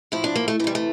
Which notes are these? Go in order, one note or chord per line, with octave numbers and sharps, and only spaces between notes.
A2 F3 E4
D4
A#3
A3
C3 E3 G3 A3
A3